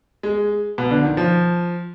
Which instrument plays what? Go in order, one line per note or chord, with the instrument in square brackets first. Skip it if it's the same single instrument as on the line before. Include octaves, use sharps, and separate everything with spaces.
[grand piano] G#3
B2
D3
D#3
F3